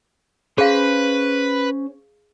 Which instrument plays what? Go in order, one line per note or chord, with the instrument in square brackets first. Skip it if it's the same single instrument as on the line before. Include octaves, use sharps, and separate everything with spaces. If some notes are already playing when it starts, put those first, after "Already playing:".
[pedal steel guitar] C#4 C5 C6 [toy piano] G#4 F5 [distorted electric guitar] B4